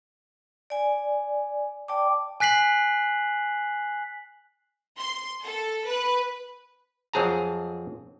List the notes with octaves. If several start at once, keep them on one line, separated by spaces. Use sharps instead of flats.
D5 G#5
D5 G5 A5 D6
G#5 F#6 B6 C7 F#7
C6
A4
B4
F2 F#3 C4 G#4 A5 A#5